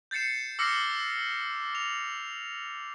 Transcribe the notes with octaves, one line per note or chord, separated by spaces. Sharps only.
G6 A6 C7 C#7 E7
D6 E6 F6 A#6 C7 C#7
F7